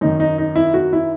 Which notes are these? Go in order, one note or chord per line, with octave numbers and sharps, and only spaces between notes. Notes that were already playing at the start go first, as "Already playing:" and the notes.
F#2 D#3 D#4
D#4
D#4
E4
F#4
E4